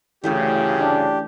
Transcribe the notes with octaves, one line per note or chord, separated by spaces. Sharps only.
D2 G2 C#3 E3 A3 C#4 G4
D4